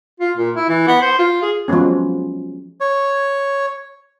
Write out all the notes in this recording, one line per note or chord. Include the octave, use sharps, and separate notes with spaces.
F4
A#2
E4
E3
B3
C5
F4
G#4
F3 F#3 G#3 B3 C#4
C#5